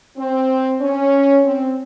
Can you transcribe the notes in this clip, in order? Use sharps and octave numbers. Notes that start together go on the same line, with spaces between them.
C4
C#4
C4